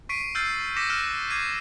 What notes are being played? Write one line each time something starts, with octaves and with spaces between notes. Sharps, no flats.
C#6 B6 C7 D7 D#7
E6 F6 G6 A6 C7
D6 A#6 B6 C#7 E7
D6 F6 F#6 A#6 D7 E7
D6 G#6 C7 D#7